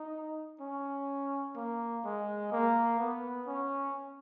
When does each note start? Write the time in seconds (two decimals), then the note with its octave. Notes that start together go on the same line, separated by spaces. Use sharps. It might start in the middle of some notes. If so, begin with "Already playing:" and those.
Already playing: D#4
0.61 C#4
1.56 A#3
2.04 G#3
2.52 A#3
2.99 B3
3.47 C#4